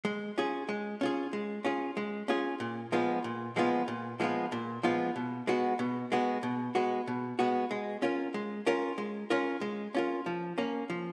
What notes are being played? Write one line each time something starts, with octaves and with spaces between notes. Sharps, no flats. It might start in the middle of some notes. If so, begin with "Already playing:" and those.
G#3
C#4 F4 G#4
G#3
C#4 F4 G#4
G#3
C#4 F4 G#4
G#3
C#4 F4 G#4
A#2
F3 G#3 B3 F4
A#2
F3 G#3 B3 F4
A#2
F3 G#3 B3 F4
A#2
F3 G#3 B3 F4
B2
G#3 B3 F#4
B2
G#3 B3 F#4
B2
G#3 B3 F#4
B2
G#3 B3 F#4
G#3
C#4 F4 A#4
G#3
C#4 F4 A#4
G#3
C#4 F4 A#4
G#3
C#4 F4 A#4
F3
A#3 C#4
F3